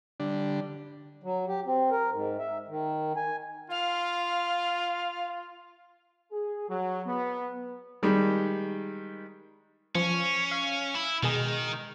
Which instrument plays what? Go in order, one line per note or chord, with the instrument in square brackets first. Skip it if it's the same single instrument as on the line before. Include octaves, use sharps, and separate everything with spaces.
[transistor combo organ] D3 G3 D4
[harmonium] F#3
G4
C4
A#4
G#2
E5
D#3
G#5
[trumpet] F4 [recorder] F5
[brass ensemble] G#4
F#3
B3
[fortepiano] D#3 G3 G#3
[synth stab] F3 [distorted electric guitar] C#4
[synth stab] F5
[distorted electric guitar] E4
[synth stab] B2 G#3 G#4 [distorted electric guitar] D#3